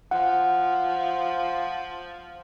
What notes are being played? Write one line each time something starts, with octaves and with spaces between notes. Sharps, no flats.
F3 F#5